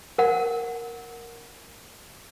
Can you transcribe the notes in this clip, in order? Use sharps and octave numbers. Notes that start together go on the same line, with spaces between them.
A#4 F#5